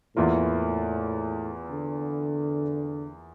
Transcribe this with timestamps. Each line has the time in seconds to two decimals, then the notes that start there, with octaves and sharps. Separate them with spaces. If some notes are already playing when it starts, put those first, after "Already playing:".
0.16 E2 A2 E3 A#3 F4 A#4
1.70 D3